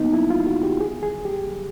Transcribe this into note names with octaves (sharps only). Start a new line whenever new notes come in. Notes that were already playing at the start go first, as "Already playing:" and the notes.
Already playing: A#3 B3 D#4
E4
F4
F#4
G4
G#4
G#4
G4